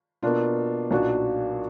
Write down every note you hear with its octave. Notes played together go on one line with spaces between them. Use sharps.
B2 A#3 D4 F4
B1 A#2 F#3 D4 F#4